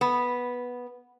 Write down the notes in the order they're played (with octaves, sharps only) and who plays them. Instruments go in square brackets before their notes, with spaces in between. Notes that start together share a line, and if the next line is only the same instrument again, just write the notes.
[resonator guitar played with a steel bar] B3